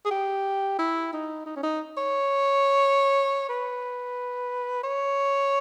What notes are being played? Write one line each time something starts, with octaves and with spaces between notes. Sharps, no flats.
G#4
G4
E4
D#4
D#4
C#4
D#4
C#5
B4
C#5